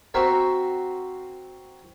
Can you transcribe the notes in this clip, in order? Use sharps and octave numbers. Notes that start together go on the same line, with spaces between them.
C4 F#4 A#4 E5